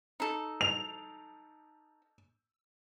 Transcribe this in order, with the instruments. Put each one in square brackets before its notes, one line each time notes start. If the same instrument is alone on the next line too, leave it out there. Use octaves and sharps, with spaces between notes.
[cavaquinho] D#4 A4
[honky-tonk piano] F7